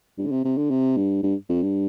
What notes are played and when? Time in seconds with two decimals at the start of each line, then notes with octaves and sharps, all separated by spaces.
0.18 G2
0.26 D3
0.31 C3
0.45 C3
0.57 D3
0.70 C3
0.97 G2
1.23 G2
1.49 F2
1.62 G2